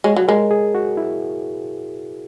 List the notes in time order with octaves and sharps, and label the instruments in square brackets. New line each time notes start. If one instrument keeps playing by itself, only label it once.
[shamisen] G#3 [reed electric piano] C#5
[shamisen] F#3
[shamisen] G#3 [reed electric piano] A#4
[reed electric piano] G#4
F#4
E4